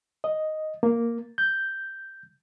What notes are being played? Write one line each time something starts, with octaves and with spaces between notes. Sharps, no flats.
D#5
A#3
G6